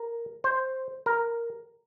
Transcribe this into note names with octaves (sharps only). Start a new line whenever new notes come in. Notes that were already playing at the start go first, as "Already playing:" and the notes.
Already playing: A#4
C5
A#4